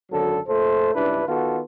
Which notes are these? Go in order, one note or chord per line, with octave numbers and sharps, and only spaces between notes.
G#1 F#2 D3 F#3 A4
A#2 A3 A4 C5
C#2 G2 D4 E4 B4
D#3 B3 F4 F#4 A4